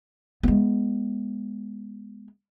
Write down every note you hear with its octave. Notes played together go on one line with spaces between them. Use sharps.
G#3 B3